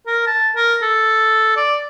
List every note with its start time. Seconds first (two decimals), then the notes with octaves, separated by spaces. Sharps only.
0.06 A#4
0.27 A5
0.56 A#4
0.82 A4
1.57 D5